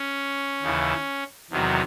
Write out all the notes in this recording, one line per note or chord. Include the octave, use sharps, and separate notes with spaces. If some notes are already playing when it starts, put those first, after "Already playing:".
Already playing: C#4
D#2 C#3 E3
E2 C3 D#3 F#3